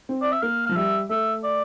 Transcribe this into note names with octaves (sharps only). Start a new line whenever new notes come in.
C4
D5
E5
A#3 F5
F3 F5
G3 E5
A3 E5
D5